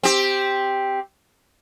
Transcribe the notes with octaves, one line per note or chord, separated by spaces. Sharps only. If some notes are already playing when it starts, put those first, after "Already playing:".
C4 G4